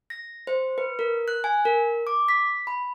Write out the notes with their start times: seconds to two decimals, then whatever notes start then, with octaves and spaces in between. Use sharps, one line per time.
0.10 A#6
0.47 C5
0.78 B4
0.99 A#4
1.28 F#6
1.44 G#5
1.65 A#4
2.07 D6
2.29 B6
2.67 B5